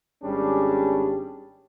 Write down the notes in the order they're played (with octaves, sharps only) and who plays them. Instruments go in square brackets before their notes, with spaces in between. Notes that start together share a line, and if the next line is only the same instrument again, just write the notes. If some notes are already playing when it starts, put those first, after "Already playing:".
[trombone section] G#1 G3 C#4 D4 G#4